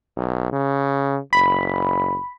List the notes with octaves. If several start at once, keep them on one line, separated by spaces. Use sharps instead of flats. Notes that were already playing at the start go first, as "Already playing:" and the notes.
B1
C#3
F#1 B5